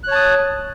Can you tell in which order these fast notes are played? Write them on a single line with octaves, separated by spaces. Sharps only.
F#6 C#5 A5 D#6